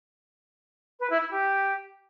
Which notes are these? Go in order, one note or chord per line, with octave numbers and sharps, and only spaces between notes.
B4
E4
E4
G4